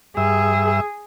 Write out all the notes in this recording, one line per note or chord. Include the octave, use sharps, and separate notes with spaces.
G2 G#4 E5